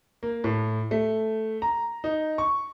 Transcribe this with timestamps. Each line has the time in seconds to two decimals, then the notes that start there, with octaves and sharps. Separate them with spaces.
0.23 A#3
0.44 A2
0.91 A3
1.62 A#5
2.04 D#4
2.38 C#6